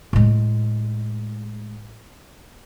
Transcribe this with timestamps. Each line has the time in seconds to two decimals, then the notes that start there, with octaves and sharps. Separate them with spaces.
0.13 A2 G#3